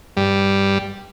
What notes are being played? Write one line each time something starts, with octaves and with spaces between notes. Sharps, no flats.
G2 G3